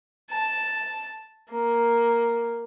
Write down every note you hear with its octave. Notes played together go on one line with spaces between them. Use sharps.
A5
A#3